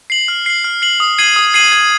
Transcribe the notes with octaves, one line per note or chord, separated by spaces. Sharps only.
C7 F#7
F6
C7 F#7
F6
C7 F#7
D#6
G#6 C7 D#7 F#7
D#6
G#6 C7 D#7 F#7
G#6